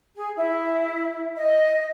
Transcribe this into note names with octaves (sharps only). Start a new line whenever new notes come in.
G#4
E4
D#5